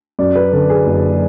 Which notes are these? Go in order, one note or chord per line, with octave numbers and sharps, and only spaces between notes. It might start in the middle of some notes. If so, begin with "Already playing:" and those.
F#2 D5
B4
D3 A4
G#4
F#1